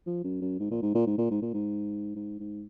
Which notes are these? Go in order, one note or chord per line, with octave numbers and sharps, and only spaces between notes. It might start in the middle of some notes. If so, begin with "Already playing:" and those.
F3
F#2
F#2
G#2
A#2
G#2
A#2
G#2
A#2
G#2
A#2
G#2
G#2
G#2